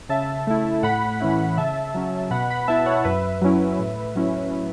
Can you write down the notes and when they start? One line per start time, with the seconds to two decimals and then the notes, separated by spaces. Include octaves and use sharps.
0.09 C#3 E5 A5
0.47 A3 E4
0.83 A2 F#5 B5
1.20 E3 C#4 E4
1.57 C#3 E5 A5
1.94 F#3 C#4
2.31 B2 F#5 B5
2.50 F#5 B5
2.60 B5
2.68 B3 E4 E5 A5
2.86 C#5 F#5
3.04 F#2 B4 E5
3.41 F#3 C#4 E4
3.79 A2
4.15 F#3 C#4 E4